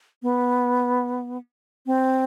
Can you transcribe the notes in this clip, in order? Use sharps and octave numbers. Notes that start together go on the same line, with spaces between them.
B3
C4